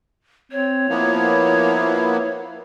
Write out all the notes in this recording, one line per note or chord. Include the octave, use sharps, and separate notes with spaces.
C4 C#5
F3 A#3 B3 E4